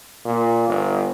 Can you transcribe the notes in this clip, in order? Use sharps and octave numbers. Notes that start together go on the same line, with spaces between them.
A#2
G1